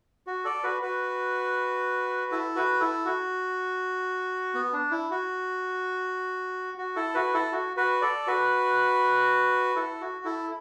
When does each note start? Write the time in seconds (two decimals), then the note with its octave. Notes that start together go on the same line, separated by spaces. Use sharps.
0.27 F#4
0.45 A4 D5
0.63 F#4 B4
0.82 F#4 B4
2.32 E4 A4
2.56 F#4 B4
2.80 E4 A4
3.05 F#4
4.54 B3
4.73 D4
4.91 E4
5.11 F#4
6.78 F#4
6.96 E4 A4
7.15 F#4 B4
7.34 E4 A4
7.52 F#4
7.77 F#4 B4
8.02 A4 D5
8.27 F#4 B4
9.76 E4 A4
10.01 F#4
10.25 E4 A4